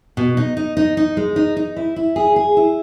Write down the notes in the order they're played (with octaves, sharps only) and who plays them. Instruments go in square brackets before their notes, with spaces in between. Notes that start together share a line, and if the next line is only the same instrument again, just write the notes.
[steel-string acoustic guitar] B2
D#4
D#4
D#4
D#4
G#3
D#4
D#4
E4
E4
G#4
G#4
E4